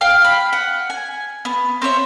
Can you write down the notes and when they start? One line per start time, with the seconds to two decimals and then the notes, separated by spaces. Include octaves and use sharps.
0.01 F5 G5 F6
0.24 B5
0.53 F#5
0.90 G#5
1.45 B3
1.82 C4 C5 C#5 E5